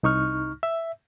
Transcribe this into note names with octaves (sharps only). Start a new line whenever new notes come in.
C2 D#4 C#6 F6
E5